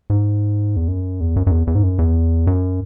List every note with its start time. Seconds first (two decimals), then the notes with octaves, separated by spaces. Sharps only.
0.10 G#2
0.76 E2
0.88 F#2
1.20 E2
1.36 F#2
1.47 F#2
1.51 E2
1.67 E2
1.75 G#2
1.83 F#2
1.99 E2
2.47 F#2